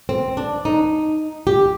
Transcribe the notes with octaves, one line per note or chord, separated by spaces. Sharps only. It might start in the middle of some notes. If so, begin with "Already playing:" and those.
C4
D4
D#4
G4